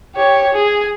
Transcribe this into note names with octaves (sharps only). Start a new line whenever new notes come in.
G4 C#5
G#4